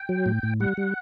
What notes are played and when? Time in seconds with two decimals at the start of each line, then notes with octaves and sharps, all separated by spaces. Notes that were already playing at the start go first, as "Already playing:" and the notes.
Already playing: G5
0.09 F#3
0.26 A2
0.43 A2
0.60 G3 F#5
0.77 G3